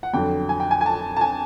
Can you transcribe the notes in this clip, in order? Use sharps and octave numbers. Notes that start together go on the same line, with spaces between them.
F#5
F2 D3 F#3 G5
G#5
G5
G#5
G#5
A5
A5
G#5